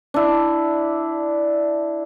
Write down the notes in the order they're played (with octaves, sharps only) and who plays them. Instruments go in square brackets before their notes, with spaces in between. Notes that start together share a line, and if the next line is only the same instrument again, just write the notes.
[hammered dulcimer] D4 E4